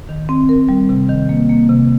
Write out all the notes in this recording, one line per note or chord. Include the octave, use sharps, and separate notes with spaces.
D#3
C4
A#4
G3
C3
D#3
A#3
A#3
C3